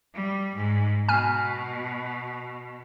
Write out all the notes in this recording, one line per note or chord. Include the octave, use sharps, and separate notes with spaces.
G3
G#2
B2 G#5 F6